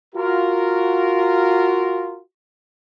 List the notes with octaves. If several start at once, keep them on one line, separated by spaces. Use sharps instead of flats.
F4 F#4 A#4